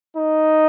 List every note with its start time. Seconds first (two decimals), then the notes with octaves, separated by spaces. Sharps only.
0.17 D#4